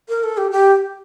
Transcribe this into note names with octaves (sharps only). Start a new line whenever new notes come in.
A#4
A4
G4
G4